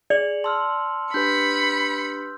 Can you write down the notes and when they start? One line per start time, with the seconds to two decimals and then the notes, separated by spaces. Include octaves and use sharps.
0.10 G#4 D5 C#7 F7 F#7
0.44 A5 C6 E6 F6
1.14 D4 G4 B4 B5 G6 C#7